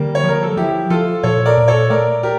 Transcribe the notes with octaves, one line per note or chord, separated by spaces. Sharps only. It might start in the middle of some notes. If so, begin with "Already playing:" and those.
Already playing: D3 G3 A#3
C#5
F3
A#4
A4
F3 E4 G4
F3 F4 A4
A#2 A4 C#5
A#4 D5
A#2
A4 C#5
A3 A#4 D5
G4 A#4